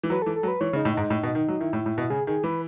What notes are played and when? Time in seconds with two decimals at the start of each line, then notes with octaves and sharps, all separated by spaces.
0.03 E3
0.10 F#3 B4
0.22 E3 A4
0.36 A4
0.43 F#3
0.48 B4
0.61 E3 C#5
0.73 C#3
0.76 D#4
0.85 A2
0.93 G#2 D#4
1.10 A2
1.23 B2
1.35 D#3
1.48 F#3
1.60 D#3 E4
1.73 A2
1.86 A2
1.98 B2
2.10 C#3 G#4
2.27 D#3 G#4
2.44 E3 B4